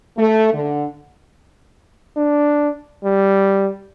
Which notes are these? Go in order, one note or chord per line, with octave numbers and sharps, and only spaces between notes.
A3
D3
D4
G3